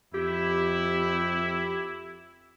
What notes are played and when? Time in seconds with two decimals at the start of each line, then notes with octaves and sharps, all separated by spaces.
0.14 F2 E4 G4